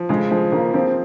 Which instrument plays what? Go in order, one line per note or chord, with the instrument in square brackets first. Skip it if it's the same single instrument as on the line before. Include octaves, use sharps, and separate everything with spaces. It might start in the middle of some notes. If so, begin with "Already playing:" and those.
Already playing: [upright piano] F3
[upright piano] C#3 [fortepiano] G#3
[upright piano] F3 [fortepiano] G#3
[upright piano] C#3 [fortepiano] A#3
[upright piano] F3 [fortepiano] C4